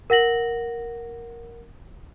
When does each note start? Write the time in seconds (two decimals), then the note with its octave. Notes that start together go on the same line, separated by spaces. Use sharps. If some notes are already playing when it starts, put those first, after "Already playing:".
0.10 A#4 F#5 A#6 F#7